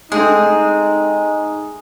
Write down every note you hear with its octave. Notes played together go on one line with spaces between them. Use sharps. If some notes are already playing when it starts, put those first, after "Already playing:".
G#3 A3 C4 D4 D#4 G#4